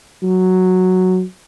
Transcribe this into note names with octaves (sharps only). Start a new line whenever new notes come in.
F#3